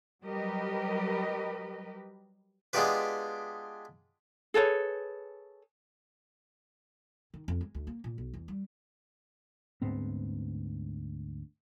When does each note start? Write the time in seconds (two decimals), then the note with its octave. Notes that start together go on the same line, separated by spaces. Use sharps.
0.24 F#3 G3 G4 A#4 B4 D#5
2.73 G#3 B3 D4 F4 G4 B4
4.54 G#4 A4 B4 C#5
7.34 D#3
7.48 F2
7.61 G#3
7.75 D2
7.87 A#3
8.04 A#2
8.18 B1
8.34 E2
8.48 G3
9.82 D2 G#2 B3 C4